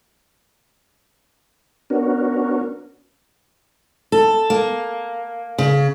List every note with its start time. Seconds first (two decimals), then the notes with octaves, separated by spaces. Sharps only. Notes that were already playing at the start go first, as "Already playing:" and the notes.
1.90 B3 C#4 D4 F#4 A#4
4.12 A4
4.50 A#3
5.58 C#3